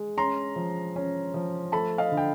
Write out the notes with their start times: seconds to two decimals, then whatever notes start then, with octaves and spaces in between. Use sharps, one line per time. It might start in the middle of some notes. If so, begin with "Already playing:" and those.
Already playing: G#3
0.17 C#4 A#5 C6
0.56 F3
0.96 C#4
1.34 F3
1.72 A3 A5 B5
1.98 D#5 F5
2.12 D3
2.17 G5